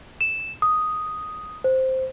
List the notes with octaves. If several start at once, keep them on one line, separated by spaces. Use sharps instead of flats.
E7
D#6
C5